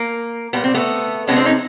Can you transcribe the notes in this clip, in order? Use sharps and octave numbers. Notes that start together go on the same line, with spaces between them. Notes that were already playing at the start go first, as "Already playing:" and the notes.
Already playing: A#3
A#2 G3 B3
C4
A3 B3
C3 F3 G#3 B3 C#4
C4 D4
C#4 D#4